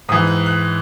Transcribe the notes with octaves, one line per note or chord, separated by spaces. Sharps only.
G#2 E3 D#6
F#6
F#6